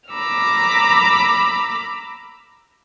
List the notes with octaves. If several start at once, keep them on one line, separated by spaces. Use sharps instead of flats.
A#5 B5 D6 E6 F6